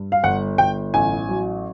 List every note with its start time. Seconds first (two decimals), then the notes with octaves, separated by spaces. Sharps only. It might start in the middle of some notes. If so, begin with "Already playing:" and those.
Already playing: G2
0.12 F5
0.23 G1 F#5
0.58 G1 G5
0.94 A1 G#5
1.29 F#3